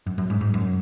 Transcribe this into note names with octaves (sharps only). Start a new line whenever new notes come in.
F#2
F#2
G#2
G#2
F#2